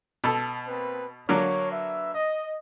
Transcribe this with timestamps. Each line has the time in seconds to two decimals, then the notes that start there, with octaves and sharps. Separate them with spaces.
0.24 B2 A4
0.67 A#3 C4 B4
1.29 D3 F#3 A#3 C#5
1.71 B4 E5
2.15 D#5